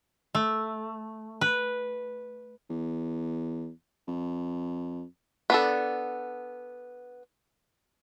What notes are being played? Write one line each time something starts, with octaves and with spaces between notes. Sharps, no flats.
A3
B4
E2
F2
B3 D4 A4